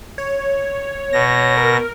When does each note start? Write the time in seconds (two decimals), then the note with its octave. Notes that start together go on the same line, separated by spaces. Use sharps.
0.18 C#5
1.13 B2 A#6
1.57 A#4